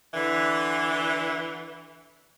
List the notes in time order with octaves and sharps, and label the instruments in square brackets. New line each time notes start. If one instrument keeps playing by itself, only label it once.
[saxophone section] D3 E3